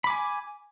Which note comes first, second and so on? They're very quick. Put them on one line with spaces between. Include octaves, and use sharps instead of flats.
B5 D6 G#5